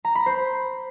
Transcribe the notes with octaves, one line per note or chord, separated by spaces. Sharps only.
A#5
B5
C5